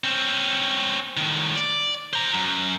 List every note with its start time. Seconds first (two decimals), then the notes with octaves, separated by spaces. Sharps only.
0.04 C4 C#4
1.17 A2 D#3
1.56 D5
2.13 C5 A#5
2.34 F#2